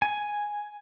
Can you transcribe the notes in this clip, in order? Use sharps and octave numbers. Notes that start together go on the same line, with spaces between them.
G#5